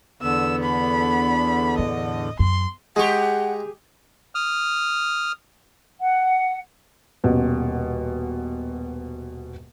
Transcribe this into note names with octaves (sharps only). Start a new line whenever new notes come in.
E2 D3 B3 E6
B5
A2 D#5
F#2 C6
G#3 G4 G#4 F#5 C#6
D#6 F6
F#5
D#1 B2